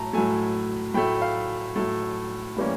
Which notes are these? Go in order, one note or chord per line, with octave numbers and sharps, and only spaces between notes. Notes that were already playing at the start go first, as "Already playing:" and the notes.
Already playing: A2 F#3 A3 A5 A#5
A2 F#3 A3 G#5
A2 F#3 A3 G5
F5
A2 F#3 A3
A2 E3 G3 A#3 C#4